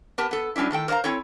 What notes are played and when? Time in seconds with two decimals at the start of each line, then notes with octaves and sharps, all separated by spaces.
0.18 B3 G4 A#4 A5
0.31 B3 A4
0.56 F#3 G3 C#4 D4 E4
0.71 A2 D#3 A4 G5
0.88 A#4 C5 D5 F5 A#5
1.04 C4 E4 A4 C#5